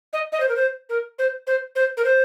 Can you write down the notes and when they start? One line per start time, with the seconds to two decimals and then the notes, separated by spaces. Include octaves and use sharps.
0.13 D#5
0.32 D#5
0.40 C5
0.49 A#4
0.56 C5
0.89 A#4
1.19 C5
1.47 C5
1.76 C5
1.97 A#4
2.05 C5